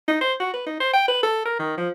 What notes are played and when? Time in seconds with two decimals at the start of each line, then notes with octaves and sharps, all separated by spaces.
0.08 D#4
0.21 C5
0.40 F#4
0.53 B4
0.66 D#4
0.80 C5
0.93 G5
1.08 B4
1.23 A4
1.45 A#4
1.59 D#3
1.77 F3